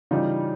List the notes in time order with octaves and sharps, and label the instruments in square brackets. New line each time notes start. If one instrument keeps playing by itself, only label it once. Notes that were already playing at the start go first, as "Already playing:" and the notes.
[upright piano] C#3 E3 G3 D#4 F4